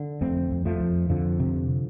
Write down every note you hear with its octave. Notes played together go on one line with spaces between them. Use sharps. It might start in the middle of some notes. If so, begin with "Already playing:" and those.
Already playing: D3
F2 A3 C4
F2
F3 A3
F2
F2 D3 F3
C3